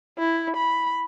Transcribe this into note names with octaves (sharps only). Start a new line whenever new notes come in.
E4
B5